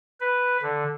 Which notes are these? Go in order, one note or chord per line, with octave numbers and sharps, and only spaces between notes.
B4
D3